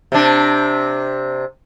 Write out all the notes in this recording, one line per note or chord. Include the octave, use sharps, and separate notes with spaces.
C3 D4